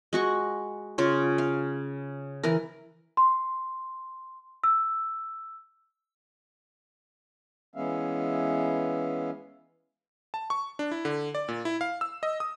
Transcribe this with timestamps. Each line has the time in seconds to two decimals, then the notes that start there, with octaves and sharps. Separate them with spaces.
0.13 G#3 F#4 C#6
0.98 C#3 F4 C#5
1.38 F5
2.43 E3 A#4
3.17 C6
4.64 E6
7.75 E3 G#3 B3 C#4 E5 F5
10.34 A5
10.50 C#6
10.79 D4
10.91 E4
11.05 D3
11.35 D5
11.48 A#2
11.65 E4
11.81 F5
12.01 E6
12.23 D#5
12.40 D#6